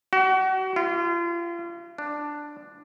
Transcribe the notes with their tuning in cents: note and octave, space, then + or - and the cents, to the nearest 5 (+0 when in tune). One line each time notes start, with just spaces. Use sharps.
F#4 +35
F4 -35
D4 +5